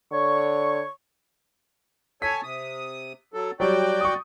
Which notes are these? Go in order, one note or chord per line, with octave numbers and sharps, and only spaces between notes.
D3 C#5 C#6
A4 C#5 G#5 B6
C3 D#6
F#3 A4
F#3 G3 F#4 D5 G5
C#6 D#6